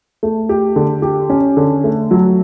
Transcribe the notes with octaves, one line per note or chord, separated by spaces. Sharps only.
A3
G4
D3
G4
C#4
D3
A3
F#3